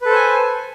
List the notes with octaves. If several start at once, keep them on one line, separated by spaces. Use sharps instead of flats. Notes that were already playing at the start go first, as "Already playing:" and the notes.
A4 B4 C5 G#5